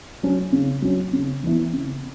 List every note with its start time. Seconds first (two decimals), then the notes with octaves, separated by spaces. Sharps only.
0.23 F#3 C#4
0.52 C#3
0.82 F#3 C#4
1.13 C#3
1.43 E3 B3 E4
1.73 C#3